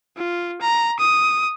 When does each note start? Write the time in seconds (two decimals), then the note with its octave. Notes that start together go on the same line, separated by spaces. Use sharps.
0.17 F4
0.61 A#5
0.99 D#6